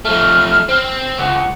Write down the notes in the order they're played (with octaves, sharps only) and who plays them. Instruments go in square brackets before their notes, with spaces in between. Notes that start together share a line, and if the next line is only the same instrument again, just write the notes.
[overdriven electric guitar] F3 A3 [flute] F6
[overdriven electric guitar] C4
[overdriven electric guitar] C#2 [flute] F#5